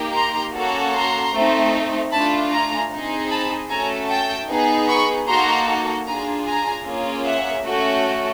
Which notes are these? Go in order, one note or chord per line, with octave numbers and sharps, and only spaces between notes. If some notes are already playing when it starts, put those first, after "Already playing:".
Already playing: A#3 D#4 G4
A#5 C6
A#3 C#4 F#4 A4
A#5 C6
A3 C4 D#4
A3 D4 F4 A5 B5
G#5 A#5
C4 D#4 G#4
A5 B5
A3 C#4 F#4 A4 G#5 A#5
G5 A5
B3 D#4 G#4
B5 C#6
A#3 D#4 F#4 A4 A#5 C6
D4 F4 G#4 G#5 A#5
G#5 A#5
A#3 C#4 F4 G#4
E5 F#5
A3 C#4 F#4 A4